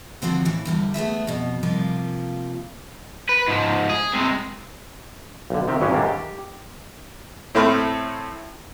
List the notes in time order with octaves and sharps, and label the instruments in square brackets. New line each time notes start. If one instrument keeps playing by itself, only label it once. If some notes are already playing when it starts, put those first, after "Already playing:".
[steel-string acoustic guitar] D3 F3 C4 F#4
A2 E3
E2 D3 G3
A3 B3 G#4 E5
F2 B2
C3 F3 G3 A#3 F4
[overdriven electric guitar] B4
G#2 F3
G#4
C3 G#3
[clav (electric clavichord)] B1 D3
C3 D#3 C4 G4
G#1 B2 F#3 C#4 G4
D#2 G#2 G3 A3 A#3 D4
G4
[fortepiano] A2 A3 C4 B5 F6